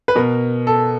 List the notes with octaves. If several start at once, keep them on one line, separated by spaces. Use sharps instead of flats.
B4
B2 A#4
A4